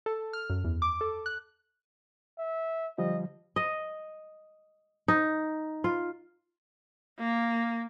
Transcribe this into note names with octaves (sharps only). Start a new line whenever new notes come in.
A4
F6
F#2
E2
D6
A4
F#6
E5
D3 F3 G3 D#5
D#5
D#4
F4
A#3